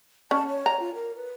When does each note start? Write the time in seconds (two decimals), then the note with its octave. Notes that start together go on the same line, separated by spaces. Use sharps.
0.31 C#4 A5
0.48 C#5
0.66 A#5
0.80 F4
0.95 A#4
1.16 B4